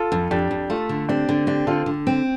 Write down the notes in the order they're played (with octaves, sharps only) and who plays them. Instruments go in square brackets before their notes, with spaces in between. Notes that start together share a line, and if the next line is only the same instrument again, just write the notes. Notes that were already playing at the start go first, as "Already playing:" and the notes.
Already playing: [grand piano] F4 A4
[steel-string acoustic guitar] F2
[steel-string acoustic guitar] F2 [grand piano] D4 G4
[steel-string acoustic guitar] F2
[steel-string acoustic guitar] A3 [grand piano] F4 A4
[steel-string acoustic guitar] D3
[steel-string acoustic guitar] C4 [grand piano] D4 G4
[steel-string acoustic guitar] D3
[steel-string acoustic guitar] C4 [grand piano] D4 G4
[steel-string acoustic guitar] D3 [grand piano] F4 A4
[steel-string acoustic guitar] D3
C4